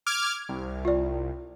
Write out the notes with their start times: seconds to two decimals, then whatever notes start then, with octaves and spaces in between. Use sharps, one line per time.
0.06 D6 F6 G#6
0.49 C2
0.85 F4 D5